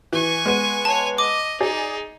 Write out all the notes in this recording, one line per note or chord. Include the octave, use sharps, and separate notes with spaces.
E3 G#5 C#6
G#3 B3 D#7
C#5 G#5 A5
D#5 D6
D#4 G#4 D5